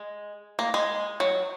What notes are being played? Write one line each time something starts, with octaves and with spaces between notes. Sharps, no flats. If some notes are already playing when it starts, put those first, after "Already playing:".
Already playing: G#3
A#3
G#3
F#3